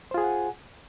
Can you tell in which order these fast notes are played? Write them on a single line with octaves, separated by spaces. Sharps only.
C5 F4 G#4 G#5 F#5